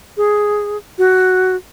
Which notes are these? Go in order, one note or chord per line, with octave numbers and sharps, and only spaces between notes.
G#4
F#4